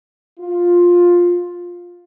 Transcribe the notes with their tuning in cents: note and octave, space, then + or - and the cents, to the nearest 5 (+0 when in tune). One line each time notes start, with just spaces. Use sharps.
F4 +10